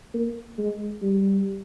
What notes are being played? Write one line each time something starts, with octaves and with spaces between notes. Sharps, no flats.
A#3
G#3
G3